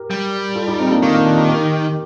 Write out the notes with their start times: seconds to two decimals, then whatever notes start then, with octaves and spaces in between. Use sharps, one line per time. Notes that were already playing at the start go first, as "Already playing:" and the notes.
Already playing: G4 A#4
0.10 G3
0.56 F4 A4
0.68 D#4 G4
0.79 C4 D#4
0.91 A#3 D4
1.02 D#3 A#3
1.14 A#3 D4
1.26 D4 F4
1.37 D#4 G4
1.48 G4 A#4